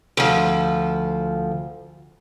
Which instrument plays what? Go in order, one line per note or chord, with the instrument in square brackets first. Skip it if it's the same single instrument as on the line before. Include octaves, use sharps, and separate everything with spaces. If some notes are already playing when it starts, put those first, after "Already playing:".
[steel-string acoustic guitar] D2 F3